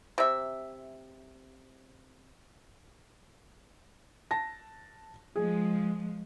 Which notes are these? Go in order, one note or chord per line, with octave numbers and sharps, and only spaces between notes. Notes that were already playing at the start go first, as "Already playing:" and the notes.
C3 E5
A5 A#6
F3 G#3 G#4